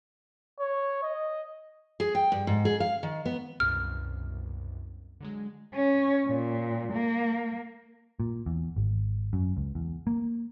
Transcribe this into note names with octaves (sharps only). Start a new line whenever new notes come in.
C#5
D#5
G#4
G5
G2
G#2
G#4
F5
D#3
B3
C2 F#2 B2 F6
D3 F#3 G#3
C#4
A#2
A#3
A#2
E2
G#1
F#2
C#2
E2
A#3